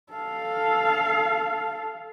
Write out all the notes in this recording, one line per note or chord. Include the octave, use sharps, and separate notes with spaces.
A4 F5